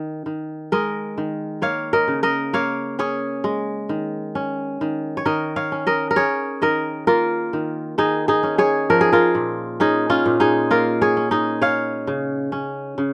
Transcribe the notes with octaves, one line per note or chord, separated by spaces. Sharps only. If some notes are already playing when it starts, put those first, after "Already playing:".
Already playing: D#3
D#3
G#3 A#4 D#5
D#3
A#3 C#5 F5
A#4 D#5
C#3
A#4 D#5
A#3 C#5 F5
C#4 G#4 C#5
G#3
D#3
C#4
D#3
C#5
D#3 A#4 D#5
C#5 F5
C#4
A#4 D#5
A#4
C#4 G#4 C#5
D#3 A#4 D#5
A#3 F4 A#4
D#3
D#3 D#4 G#4
D#4 G#4
C#4
G#4 C#5
F3 A#4
G#4
F4 A#4
A#2
C#4 D#4 G#4
C#4 F4
A#2
D#4 G#4
A#3 F4 A#4
G#4 C#5
C#4
D#4 G#4
C#4 C#5 F5
C#3
C#4
C#3